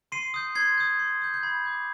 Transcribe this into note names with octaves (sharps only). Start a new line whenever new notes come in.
C6 C7 D#7
D#6 G6
C6 G#6 C7
D#6 G6
C6
D#6 G6
G6
B5 G#6
D6 G6